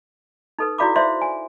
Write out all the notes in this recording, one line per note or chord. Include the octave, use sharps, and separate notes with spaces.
D#4 A4 B4
E4 F#4 D5 F5 B5 D6
C5 D5 E5 F5 C6
G#5